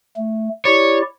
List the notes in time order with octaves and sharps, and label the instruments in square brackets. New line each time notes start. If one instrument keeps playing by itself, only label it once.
[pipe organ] A3
[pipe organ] E4 G4 D5 [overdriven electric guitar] C#5